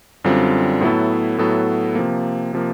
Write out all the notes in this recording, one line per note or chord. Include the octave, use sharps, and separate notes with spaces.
F#2 D3 G3 C4 F4
A2 F#3 B3 E4 A4
A2 F#3 B3 E4 A4
C3 F3 A#3
C3 F3 A#3